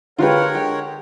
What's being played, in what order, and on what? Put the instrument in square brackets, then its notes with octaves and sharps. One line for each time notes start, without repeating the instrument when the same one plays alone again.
[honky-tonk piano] D3 G#3 G4 [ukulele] F4 B4 [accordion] A#4 C#5 F#5
[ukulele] G5